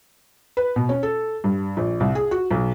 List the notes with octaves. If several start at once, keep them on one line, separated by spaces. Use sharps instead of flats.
B4
B2
C#4
A4
G2
A#1
C2
G#4
F#4
B1